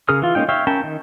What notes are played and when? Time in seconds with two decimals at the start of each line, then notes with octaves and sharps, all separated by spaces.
0.09 C#3 G#4 A#4 D#6 F6
0.22 E3 F4
0.35 G#3 A#3 C#4 D#4 G5
0.49 C#5 E5 F5 G5
0.67 C#4 A#4 G5 A5 B5
0.84 D#3